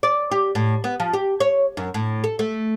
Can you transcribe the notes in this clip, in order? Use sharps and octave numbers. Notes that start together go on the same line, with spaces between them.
D5
G4
A2
B3
F3
G4
C#5
F#2
A2
A4
A3